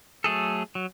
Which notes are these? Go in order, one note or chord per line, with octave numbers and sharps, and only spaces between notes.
F#3 A3 G#4 A4
F#3